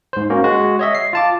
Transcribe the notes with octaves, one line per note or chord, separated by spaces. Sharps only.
G#2 C5
A#3 C#4 F#4
G#3 F#4
C#5 D#5 E5
C7
F4 A5 D6